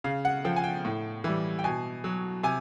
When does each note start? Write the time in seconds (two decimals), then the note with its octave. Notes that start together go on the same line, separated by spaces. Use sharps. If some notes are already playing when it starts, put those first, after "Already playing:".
0.04 C#3 F5
0.25 F#5
0.45 F3 G5
0.56 G#5
0.64 G5
0.85 A2
1.24 E3 G3
1.59 G5
1.64 B2 G#5
2.04 F#3
2.43 C3 G#5